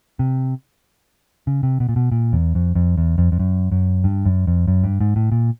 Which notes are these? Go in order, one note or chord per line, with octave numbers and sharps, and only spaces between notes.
C3
C#3
C3
B2
A#2
B2
A#2
E2
F2
F2
E2
F2
F2
F#2
F#2
G2
F#2
F2
F#2
G2
G#2
A2
A#2